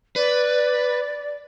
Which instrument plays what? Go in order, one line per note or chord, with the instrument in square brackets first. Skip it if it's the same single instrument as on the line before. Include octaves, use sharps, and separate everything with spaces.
[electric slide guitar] B4 [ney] D5